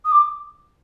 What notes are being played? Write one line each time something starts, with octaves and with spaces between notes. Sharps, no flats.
D#6
D6